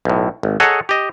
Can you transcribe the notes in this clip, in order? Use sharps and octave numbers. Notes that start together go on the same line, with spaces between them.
B1 A2
G#1
G#4 A4 C#5 D#5 F#5 A#5
G4 D#5